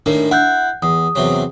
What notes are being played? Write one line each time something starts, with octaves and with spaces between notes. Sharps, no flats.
A2 D#3 A#3 D4
E4 F#5 F#6 G6
E2 D#6
E2 C3 F#3